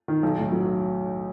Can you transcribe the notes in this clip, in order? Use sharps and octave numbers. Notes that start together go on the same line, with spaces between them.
D#3
B1
A2
F#3